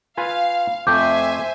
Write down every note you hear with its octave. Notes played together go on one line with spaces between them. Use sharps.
F4 B4 F5 G#5
F2 A3 C5 E5 G5 G#5 D6 G6